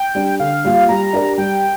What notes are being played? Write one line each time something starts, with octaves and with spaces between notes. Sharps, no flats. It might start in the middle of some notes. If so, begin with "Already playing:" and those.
Already playing: G5
G3 D4
D3 F5
G3 A#3 F4
G3 A#5
D4 G4 A#4 D5
G3 G5